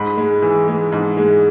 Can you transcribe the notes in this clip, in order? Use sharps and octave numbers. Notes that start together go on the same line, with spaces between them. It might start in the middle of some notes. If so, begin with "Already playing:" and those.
Already playing: G#2 B5
G#3
E3
G#3
G#2
G#3